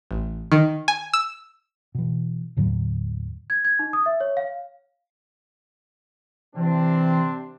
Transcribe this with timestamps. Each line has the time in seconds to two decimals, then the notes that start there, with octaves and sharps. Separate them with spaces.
0.11 A1
0.52 D#3
0.88 G#5
1.13 E6
1.95 B2 E3
2.57 D#2 A2 D3 F#3
3.50 G#6
3.65 G#6
3.79 D#4
3.93 D#6
4.06 E5
4.20 C#5
4.37 F5
6.56 C3 E3 C4 D4